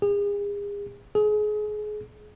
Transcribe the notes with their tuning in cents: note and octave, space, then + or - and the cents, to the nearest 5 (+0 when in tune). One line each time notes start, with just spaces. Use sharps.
G#4 -35
G#4 +30